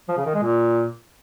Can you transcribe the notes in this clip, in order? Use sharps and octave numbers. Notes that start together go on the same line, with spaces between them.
F3
C#3
D#3
G#3
A#2